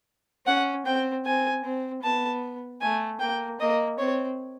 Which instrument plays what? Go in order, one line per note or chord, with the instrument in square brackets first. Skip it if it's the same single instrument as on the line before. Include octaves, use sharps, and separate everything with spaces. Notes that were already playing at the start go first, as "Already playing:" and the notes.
[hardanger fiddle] C#4 [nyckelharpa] F#5
[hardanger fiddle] C4 [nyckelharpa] G5
[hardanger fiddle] C4 [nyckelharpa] G#5
[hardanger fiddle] C4
[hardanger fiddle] B3 [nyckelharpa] A5
[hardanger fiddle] A3 [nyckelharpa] G#5
[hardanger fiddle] A#3 [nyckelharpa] G5
[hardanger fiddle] A#3 [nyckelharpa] D#5
[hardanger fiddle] C4 [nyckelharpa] C#5